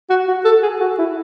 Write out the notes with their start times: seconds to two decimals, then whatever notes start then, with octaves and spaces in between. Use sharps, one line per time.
0.10 F#4
0.28 F#4
0.45 A4
0.63 G#4
0.80 F#4
0.99 E4